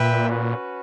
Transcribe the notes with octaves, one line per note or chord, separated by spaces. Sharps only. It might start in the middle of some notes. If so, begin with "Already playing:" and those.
Already playing: A#2 B4 E5 G5
C#4 F#4 B4